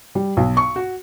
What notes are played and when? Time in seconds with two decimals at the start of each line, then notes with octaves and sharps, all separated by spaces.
0.15 G3
0.37 B1
0.57 C#6
0.76 F#4